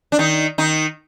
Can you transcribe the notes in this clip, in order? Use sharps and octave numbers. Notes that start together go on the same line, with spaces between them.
D4
D#3 D#4
D#3 D#4